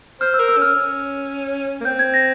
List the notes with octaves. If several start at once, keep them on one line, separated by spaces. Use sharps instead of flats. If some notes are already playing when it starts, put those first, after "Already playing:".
C5 F6
E6
A#4
E6
C#4 F6
C#4
A#3
C4 G6
G#6
A#6